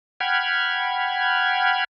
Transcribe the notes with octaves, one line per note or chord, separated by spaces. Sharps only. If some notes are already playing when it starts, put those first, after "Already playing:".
F#5 G5 B5 F6 G#6